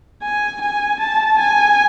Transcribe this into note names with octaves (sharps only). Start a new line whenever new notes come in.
G#5
G#5
A5
G#5